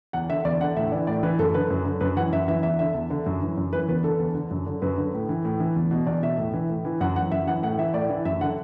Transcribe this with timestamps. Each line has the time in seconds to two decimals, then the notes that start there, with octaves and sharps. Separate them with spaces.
0.13 E2 F#5
0.29 D3 E5
0.45 E2 D5
0.61 D3 F#5
0.76 A2 E5
0.92 E3 D5
1.07 A2 D5
1.23 E3 B4
1.39 F#2 A4
1.54 D3 B4
1.70 F#2
1.85 D3
2.01 F#2 B4
2.17 E3 F#5
2.32 F#2 E5
2.48 E3 E5
2.63 E2 E5
2.79 D3 E5
2.94 E2
3.10 D3
3.26 F#2
3.42 E3
3.57 F#2
3.73 E3 B4
3.88 E2 B4
4.04 D3 A4
4.19 E2
4.35 D3
4.51 F#2
4.66 D3
4.82 F#2 B4
4.98 D3
5.14 A2
5.29 E3
5.45 A2
5.60 E3
5.76 E2
5.91 B2
6.07 E2 D5
6.23 B2 E5
6.38 A2
6.54 E3
6.69 A2
6.85 E3
7.01 F#2 F#5
7.16 E3 F#5
7.32 F#2 E5
7.47 E3 F#5
7.63 A2 F#5
7.78 E3 E5
7.94 A2 D5
8.09 E3
8.25 F#2 E5
8.41 D3 F#5